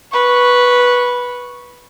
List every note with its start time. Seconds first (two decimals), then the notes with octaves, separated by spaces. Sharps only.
0.12 B4 C#6